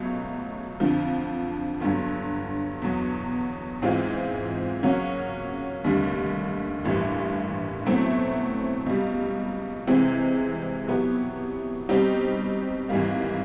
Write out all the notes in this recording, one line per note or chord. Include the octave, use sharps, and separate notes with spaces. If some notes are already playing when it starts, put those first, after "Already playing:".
Already playing: C#2 B2 F#3 A3
F2 D3 F3
G1 G2 D3 F#3
E2 B2 F#3
G#2 E3 G#3 C4 F4
C#3 F#3 A#3 C#4 F#4
F1 D#2 D3 G3
A1 G2 E3 G3 A#3
B2 F#3 A3 C4 E4
C#2 B2 G3
C3 E3 G#3 C4
B2 F#3 B3 E4 G4
B2 G3 C4 D#4 G4
G#1 G#2 E3 G3 A#3